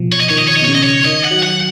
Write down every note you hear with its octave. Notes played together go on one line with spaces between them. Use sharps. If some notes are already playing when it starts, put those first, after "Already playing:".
Already playing: B2 F3
C#5
D#5
D#3 C#5
D#5
C#5
D#5
B2
C#3 C#5
D#5
C#5
D#3 D#5
F#5
F#3
F#5